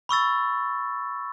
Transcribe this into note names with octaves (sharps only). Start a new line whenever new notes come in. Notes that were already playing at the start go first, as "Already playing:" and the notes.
B5 C#6 E6 A6